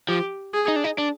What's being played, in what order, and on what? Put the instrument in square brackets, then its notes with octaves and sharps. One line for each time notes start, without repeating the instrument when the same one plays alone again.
[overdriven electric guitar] F3 [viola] G4
[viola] G#4
[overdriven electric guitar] D#4
D4
D#4
D4